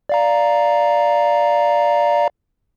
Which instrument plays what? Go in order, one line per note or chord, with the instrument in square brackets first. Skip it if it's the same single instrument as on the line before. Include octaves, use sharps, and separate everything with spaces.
[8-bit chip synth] D5 F5 A#5